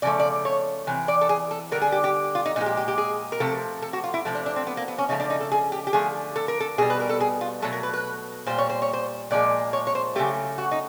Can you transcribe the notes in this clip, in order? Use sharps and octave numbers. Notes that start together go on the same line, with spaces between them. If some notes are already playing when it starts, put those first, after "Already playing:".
C#3 F3 A3 D5
D5
C#5
C3 E3
D5
A4
G#4
A4
D3 G3 A#4
G#4
G4
G4
F4
D#4
A#2 F3 G#3 D#4
G4
G4
G4
G#4
A#4
C3 F3 A3 A4
A4
F#4
F4
E4
C3 F3 A3
D4
D4
C4
B3
A#3
B3
C#4
C#3 F3 A3 D#4
D4
D#4
A4
G#4
G4
G4
D3 F3 A3 G#4
A4
A#4
A4
B2 G3 G#4
B4
A#4
A4
G#4
F4
B2 F#3 A3 A4
A#4
B4
B4
A#2 G3 C5
C#5
C5
C#5
C5
A#2 F3 G#3 D5
C#5
C#5
C5
C#3 F#3 A3 G4
F#4
D#4